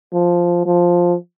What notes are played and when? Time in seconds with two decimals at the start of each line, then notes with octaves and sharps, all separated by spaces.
0.13 F3
0.66 F3